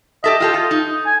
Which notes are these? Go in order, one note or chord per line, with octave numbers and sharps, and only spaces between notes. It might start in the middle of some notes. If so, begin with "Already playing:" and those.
G4 A4 D#5 E5
F4 G4 A4
F4
D#4
G#5